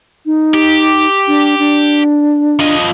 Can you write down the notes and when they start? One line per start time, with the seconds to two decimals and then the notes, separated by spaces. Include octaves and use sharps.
0.26 D#4
0.54 G4
1.28 D4
1.59 D4
2.59 F3 D#5